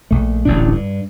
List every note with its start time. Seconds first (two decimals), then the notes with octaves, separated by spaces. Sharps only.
0.11 A#1 A3
0.45 D1 A1 A2 D4
0.72 G2